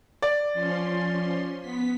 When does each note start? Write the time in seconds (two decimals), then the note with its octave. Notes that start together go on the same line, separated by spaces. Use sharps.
0.22 D5
0.54 F3 C#4 C6
1.61 B3 B6